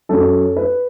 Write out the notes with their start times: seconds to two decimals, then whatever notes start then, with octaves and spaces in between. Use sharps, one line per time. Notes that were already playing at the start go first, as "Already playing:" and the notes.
0.09 F#2 F#3 C#4 A4
0.56 B4